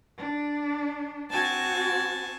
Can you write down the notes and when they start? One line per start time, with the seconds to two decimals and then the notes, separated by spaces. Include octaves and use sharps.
0.18 D4
1.31 C4 F#4 G#5 A5